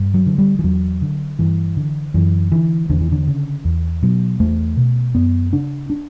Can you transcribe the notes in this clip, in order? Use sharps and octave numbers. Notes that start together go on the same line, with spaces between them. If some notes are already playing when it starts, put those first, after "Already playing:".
Already playing: G2
F#3
D3
G3
E3
E2 F#3
D3
G2 E3
D3
F#2 E3
D3 E3
E2 D3
E3
D3
C#3
E2
B2 F#3
E2 A3
B2
F#2 B3
C#3 D4
D4